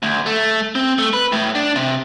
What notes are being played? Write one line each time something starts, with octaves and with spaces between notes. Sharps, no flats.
D2
A3
C4
A3
B4
A2
D4
C3